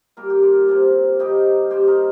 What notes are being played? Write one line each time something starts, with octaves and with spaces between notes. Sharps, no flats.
A#2 G3 A#3 A#4
G4
F4 A#4
C3 F3 A#3
C3 D#3 G3 A#3 D#4 G4
A#2 G3 A#3 G4 C5
A#4 D#5